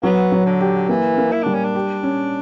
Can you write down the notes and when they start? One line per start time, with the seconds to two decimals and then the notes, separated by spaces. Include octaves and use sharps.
0.03 F#3 B3
0.32 F#3
0.46 D3
0.61 G4
0.89 E3 A#3
1.18 A#3
1.32 E4
1.43 G3 D4
1.54 C#4
1.64 D4
1.75 G4
2.03 C#4